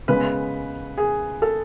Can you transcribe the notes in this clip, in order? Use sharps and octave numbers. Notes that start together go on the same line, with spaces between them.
C#3 G#3 B3 B4
G#4
A4